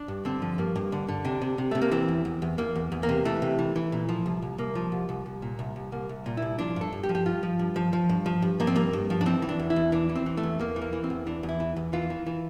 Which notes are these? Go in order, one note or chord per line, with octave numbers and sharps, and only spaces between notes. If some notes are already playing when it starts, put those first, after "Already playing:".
Already playing: D4
G2
D3 C4
F3
G2 A#3
G2
D3
D3
C3 D4
C3
C3
C3 A3
A#3
E3 C4
E2
E2
E2
E2 A#3
E2
E2
A#3
C3
E3 A3
C3
E3
E3
A#2
F3
C2
C2
C2 A#3
F3
C2
C2
C2
A#2
C2
C2
C2 A#3
C2
A#2
E4
C2
F3 D4
G2 A4
G2
G4
F3
G4
G2 F4
F3
G2
F3
F3
G2
F3
G2
F3 A#3
C4
G2 A#3
G2
F3
D4
E3 C4
E3
D4
E2
E4
E2
E3 D4
E3
C4
E3
A3
E2
E2 A#3
E3
A#3
E3
C4
E2
E3 D4
E2
E4
E3
E2
E3 F4
E3
E3